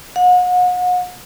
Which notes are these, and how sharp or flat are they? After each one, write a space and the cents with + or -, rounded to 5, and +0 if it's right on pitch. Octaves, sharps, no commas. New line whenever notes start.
F#5 -40